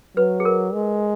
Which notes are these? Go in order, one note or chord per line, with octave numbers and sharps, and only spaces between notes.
F#3 B4
G#4
A#4
G#3